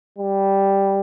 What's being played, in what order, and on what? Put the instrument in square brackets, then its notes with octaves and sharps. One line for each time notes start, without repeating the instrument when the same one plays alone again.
[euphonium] G3